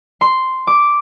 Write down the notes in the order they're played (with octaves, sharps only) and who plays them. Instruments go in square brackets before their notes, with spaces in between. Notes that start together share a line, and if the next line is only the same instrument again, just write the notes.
[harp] C6
D6